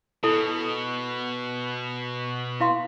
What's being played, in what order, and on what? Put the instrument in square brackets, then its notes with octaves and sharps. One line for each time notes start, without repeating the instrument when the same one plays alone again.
[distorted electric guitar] B2 [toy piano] E4 A4 A5
[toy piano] E4 F5 C6